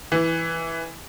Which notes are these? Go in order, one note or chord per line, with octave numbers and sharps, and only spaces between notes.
E3